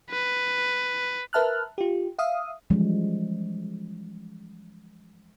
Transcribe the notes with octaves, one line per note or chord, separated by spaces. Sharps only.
B4
A#4 B4 E5 A5 F6 F#6
F4 G4
E5 F5 D#6
E3 F3 G3 G#3 C#4